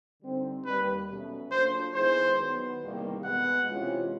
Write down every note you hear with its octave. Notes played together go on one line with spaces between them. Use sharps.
D3 G3 C4 D#4
D#2 D#3 G3 B4
B2 F#3 A3 C#4
F#3 A#3 D4 F4 A4 C5
D#3 G#3 B3 E4 G#4 C5
D#3 F#3 B3
E2 C3 D#3 G3 A#3
B2 G#3 B3 F#5
C3 E3 G#3 C#4 F4